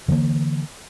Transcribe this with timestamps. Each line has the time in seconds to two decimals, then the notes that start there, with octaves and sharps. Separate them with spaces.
0.08 D3 E3 G3 A#3